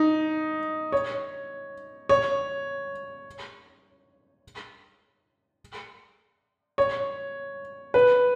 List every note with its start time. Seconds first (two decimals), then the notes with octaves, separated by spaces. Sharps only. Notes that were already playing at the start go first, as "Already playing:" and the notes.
Already playing: D#4
0.92 C#5
2.09 C#5
6.78 C#5
7.94 B4